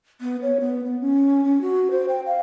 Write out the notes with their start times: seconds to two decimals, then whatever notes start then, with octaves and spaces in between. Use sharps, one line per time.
0.21 B3
0.42 C#5
0.60 B3
0.84 B3
1.01 C#4
1.44 C#4
1.61 F#4
1.91 C5
2.09 G5
2.26 F5